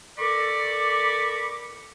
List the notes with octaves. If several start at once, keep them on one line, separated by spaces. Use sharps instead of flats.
A4 A#4 D5 B5 C#6 D6